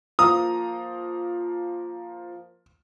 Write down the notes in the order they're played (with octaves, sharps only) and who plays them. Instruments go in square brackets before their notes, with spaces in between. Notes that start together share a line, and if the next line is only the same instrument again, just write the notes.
[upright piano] F3 A#3 A#5 [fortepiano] D#6